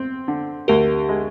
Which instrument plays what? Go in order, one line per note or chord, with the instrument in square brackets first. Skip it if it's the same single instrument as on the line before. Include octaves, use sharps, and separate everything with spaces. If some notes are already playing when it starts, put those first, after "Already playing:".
Already playing: [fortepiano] C4
D3
[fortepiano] D2 [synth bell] G4 A#4
[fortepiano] G#3